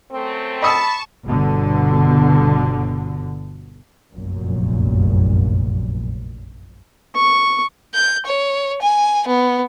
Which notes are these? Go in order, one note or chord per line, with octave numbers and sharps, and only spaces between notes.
F#2 A3 C4
D#5 A5 B5 C#6 D#6 E6
G1 B2 D3
F1 A#1 F#2 A#2
C#6
G6
C#5
G#5
B3